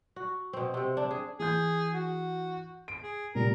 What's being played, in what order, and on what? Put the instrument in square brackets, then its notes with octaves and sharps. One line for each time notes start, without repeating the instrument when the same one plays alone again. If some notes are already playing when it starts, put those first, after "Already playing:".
[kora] F#4
B2 C4
C3 C4
D4
G#4
[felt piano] E3 G6 [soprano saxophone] G#4
[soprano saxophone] F#4
[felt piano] D7
[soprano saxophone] G#4
[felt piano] A#2 G3 [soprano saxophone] A#4